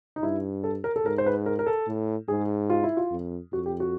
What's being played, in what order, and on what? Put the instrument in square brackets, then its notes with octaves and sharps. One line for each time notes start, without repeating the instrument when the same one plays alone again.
[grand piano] D#4
[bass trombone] G2 [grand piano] E4
[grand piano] A4
A#4
A4
[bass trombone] G#2 [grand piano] A#4
[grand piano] C5
B4
A#4
A#4
A4
[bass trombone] A2
[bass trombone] G#2 [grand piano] G#4
[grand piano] F4
E4
F4
[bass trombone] F2
[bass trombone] F2 [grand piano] F#4
[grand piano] G4
F#4